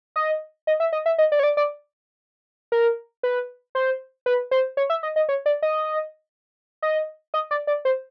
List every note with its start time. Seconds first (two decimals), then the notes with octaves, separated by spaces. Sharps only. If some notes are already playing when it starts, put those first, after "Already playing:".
0.16 D#5
0.67 D#5
0.80 E5
0.93 D#5
1.06 E5
1.18 D#5
1.32 D5
1.39 C#5
1.43 D5
1.57 D5
2.72 A#4
3.23 B4
3.75 C5
4.26 B4
4.51 C5
4.77 C#5
4.90 E5
5.03 D#5
5.16 D#5
5.29 C#5
5.46 D5
5.62 D#5
6.82 D#5
7.34 D#5
7.51 D5
7.67 D5
7.85 C5